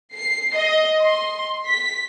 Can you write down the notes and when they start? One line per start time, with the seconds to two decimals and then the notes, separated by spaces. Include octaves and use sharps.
0.14 C7
0.57 D#5
1.01 C6
1.68 B6